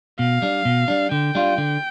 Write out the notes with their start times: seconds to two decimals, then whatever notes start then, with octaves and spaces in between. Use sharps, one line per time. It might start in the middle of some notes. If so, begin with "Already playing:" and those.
0.19 B2 F5
0.42 G3 D4
0.65 B2
0.88 G3 D4
1.12 D3 G5
1.35 G3 D4 F4
1.58 D3